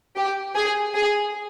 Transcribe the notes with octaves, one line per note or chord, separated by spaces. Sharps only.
G4
G#4
G#4